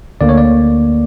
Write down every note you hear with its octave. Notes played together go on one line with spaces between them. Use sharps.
D2 D3 A#3 D5
C#5
D5